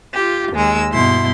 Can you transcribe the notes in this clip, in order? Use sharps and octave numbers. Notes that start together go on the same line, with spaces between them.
F4 G4
D#2 G#3 E6
G2 B2 E4 C6